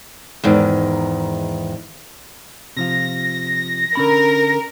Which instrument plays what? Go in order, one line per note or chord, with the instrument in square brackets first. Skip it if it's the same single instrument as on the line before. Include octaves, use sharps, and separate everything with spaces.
[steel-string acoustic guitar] E2 G#2 D#3
[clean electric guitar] C3 F3 F4 [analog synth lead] A#6
[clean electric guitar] D3 C#4 B5 [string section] A#4